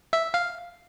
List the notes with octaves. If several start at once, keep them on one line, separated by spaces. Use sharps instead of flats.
E5
F5